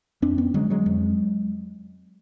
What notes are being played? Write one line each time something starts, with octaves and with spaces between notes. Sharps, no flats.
F2 C4 D4
B3 C#4
D3 F#3 G#3
F#3 G#3
F2